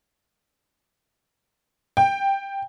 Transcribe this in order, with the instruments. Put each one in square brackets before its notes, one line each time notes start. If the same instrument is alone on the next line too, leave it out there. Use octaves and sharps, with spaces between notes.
[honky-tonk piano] G5